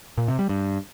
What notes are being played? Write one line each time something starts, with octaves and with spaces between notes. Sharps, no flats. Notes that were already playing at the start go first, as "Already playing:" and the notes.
A#2
C3
G3
G2